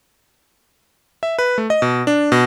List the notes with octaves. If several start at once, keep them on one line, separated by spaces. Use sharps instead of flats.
E5
B4
A3
D#5
B2
D4
B2